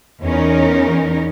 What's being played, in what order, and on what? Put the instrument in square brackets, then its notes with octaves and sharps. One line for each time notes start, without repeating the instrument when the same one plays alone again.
[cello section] E2 C#4 D#4 A#4